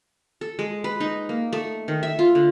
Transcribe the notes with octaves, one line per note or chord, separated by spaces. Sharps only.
A4
G#3
B4
D#4
A#3
A3
D#3
E5
F4
D3